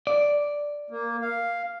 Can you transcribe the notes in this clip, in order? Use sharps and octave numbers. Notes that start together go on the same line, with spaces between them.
D5
A#3
F5